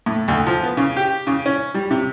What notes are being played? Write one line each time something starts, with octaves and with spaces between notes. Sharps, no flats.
A2
D2
F3
B3
C#3
G4
C#3
C#4
G3
C3